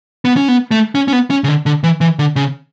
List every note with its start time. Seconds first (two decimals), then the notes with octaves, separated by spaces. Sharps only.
0.25 B3
0.37 C#4
0.48 B3
0.71 A3
0.95 C#4
1.08 C#4
1.13 B3
1.30 C#4
1.44 C#3
1.48 D3
1.66 D3
1.84 E3
2.01 E3
2.19 D3
2.36 C#3